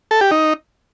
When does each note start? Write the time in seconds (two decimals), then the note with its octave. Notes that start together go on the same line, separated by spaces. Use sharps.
0.11 A4
0.21 G4
0.31 D#4